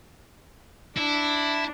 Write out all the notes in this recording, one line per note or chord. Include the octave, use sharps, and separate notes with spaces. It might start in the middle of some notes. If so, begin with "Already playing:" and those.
D4 E4